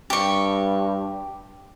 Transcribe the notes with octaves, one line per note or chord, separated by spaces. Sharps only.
G2 G4 C#6